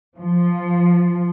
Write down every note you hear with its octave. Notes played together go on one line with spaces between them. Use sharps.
F3